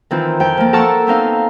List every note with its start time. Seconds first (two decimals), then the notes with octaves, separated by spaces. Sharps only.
0.11 D#3 E3 C4 F4
0.40 F2 G5
0.57 F3 A#3
0.73 A4 A#4 F#5 A5 C#6 E6
1.07 B3 C4 D#4 F5